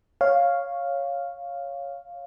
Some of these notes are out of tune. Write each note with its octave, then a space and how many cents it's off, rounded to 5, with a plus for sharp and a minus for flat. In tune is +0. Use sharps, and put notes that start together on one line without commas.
C#5 +0 F5 +0